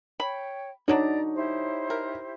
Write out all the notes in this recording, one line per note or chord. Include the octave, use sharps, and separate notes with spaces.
C#5 G5 B5
D3 F#3 D4 D#4 C#5 D5 A#5
E4 G4 C5
A#4